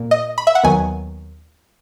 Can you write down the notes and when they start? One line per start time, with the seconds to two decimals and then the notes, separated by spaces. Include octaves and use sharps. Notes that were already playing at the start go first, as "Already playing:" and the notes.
Already playing: A#2 A#3
0.11 D#5
0.38 B5
0.47 E5
0.55 F#5
0.63 D#2 D#3 F#3 B3 G#5